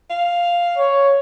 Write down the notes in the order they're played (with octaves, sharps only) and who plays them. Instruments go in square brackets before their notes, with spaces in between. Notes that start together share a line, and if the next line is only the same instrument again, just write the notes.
[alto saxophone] F5
[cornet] C#5